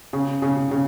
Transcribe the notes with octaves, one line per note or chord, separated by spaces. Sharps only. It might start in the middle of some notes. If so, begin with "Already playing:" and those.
C#3
C#3
C#3